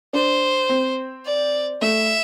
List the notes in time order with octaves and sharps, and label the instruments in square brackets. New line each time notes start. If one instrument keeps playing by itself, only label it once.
[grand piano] D4 [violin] C5
[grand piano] C4
[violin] D5
[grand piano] A3 [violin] E5